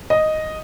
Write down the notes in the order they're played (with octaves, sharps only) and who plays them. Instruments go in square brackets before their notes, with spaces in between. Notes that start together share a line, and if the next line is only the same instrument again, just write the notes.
[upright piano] D#5